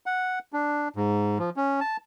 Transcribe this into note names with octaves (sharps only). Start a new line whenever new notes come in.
F#5
D4
G#2
F3
C#4
A5